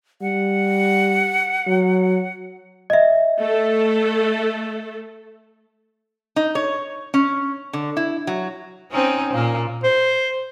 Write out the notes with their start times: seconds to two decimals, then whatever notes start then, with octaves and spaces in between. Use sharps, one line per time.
0.22 G3 F#5
1.67 F#3
2.90 D#5 E5
3.40 A3 A4
6.36 D#4
6.55 C#5
7.14 C#4
7.73 D3
7.97 E4
8.27 F#3
8.91 C4 C#4 D#4
9.33 A#2 A#3
9.84 C5